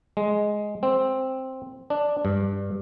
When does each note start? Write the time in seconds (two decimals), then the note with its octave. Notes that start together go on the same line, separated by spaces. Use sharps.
0.17 G#3
0.83 C4
1.90 D4
2.25 G2